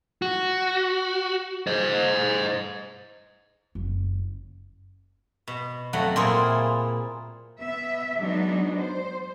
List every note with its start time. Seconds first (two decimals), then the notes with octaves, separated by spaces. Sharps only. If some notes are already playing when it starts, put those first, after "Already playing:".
0.22 F#4
1.67 C5 D#5
3.75 F#1 C#3
5.48 B2
5.93 F2 F#3 A3 F#5
6.16 A#2 C4 E4 F4 G#4
7.59 B3 E5
8.20 F#3 G#3 B3 D4 D#4
8.77 C5